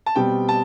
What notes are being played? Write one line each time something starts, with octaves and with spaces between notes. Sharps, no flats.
A5
B2 G3 C4 G5
A5